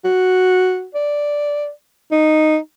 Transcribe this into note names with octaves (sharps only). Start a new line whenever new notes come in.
F#4
D5
D#4